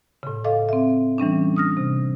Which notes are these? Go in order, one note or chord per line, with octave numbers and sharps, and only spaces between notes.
A2 C#3
A4 D#5 F5 D6
C4 E5
E3 G3 C#4 D4
D#6 F6 A#6
C3